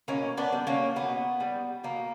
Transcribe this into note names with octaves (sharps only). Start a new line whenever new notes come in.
B2 A#3 C#4
B3 D4
G3
A#3 C#4
B2 B3
G3
B2 A#3